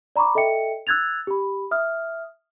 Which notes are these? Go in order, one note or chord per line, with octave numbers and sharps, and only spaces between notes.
D5 A#5 B5 C#6 D6
A4 D#5 E5 G5 C#7
E6 F#6 G#6 A6 F7
G4 B5
E5 D#6 F6